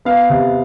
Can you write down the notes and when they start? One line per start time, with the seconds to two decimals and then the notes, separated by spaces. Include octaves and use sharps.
0.05 B3 F5
0.30 C3